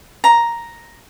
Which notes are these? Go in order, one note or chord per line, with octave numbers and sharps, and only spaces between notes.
A#5